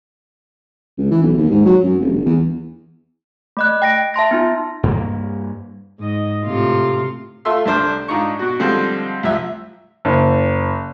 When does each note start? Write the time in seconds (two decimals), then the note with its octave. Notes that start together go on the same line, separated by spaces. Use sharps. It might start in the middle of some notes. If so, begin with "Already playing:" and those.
0.98 C#2
1.11 E3
1.23 B1
1.37 D#2
1.51 G#2
1.66 F#3
1.83 F#2
2.00 F1
2.12 G1
2.26 E2
3.57 A3 D#5 F#6
3.82 G5 A#6 D7
4.14 E5 A5 C6 A#6
4.31 B3 D#4 F4
4.83 G2 A#3
5.99 G#2 D#5
6.45 A2 C3 F4
7.45 A3 F4 A4 E5 C6 E6
7.65 C2 A3 D4 C5 F6
8.08 G#2 D4 D#4 F4 A#5 C#6
8.39 B2 F#4
8.59 D3 F3 G3 G#3 C4 C5
9.23 C2 F3 E5 E6
10.05 F#1